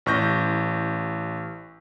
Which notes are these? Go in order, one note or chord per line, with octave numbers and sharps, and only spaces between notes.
A1 C#6 G6 A#6